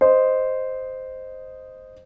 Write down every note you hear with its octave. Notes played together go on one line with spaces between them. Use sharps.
C5 D#5